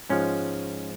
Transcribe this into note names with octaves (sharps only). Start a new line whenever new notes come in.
G#2 F3 G#3 C#4